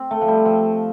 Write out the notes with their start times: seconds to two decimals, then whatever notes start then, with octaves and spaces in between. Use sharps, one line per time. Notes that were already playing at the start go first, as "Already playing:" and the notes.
Already playing: C4
0.11 A3
0.21 F3
0.28 G3
0.45 F3